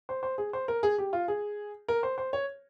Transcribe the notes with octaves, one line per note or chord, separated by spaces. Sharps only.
C5
C5
G#4
C5
A#4
G#4
G4
F4
G#4
A#4
C5
C5
C#5